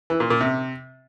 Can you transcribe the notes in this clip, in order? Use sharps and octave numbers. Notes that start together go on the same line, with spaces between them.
E3
A#2
A#2
C3